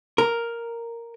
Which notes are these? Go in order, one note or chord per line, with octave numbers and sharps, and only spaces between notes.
A#4